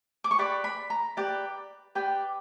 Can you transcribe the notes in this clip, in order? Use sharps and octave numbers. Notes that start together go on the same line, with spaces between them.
D6
C#6
G4 B4 D5 B5
B5
A#5
G4 B4 D5
G4 B4 D5 G5